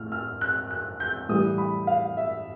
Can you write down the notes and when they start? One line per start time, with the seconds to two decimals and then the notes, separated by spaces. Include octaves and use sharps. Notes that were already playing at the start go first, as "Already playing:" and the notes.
Already playing: A2 F6
0.12 F6
0.41 F#6
0.71 F#6
1.00 G6
1.29 A2 E3 G3 D#6
1.58 B5
1.87 F5
2.17 E5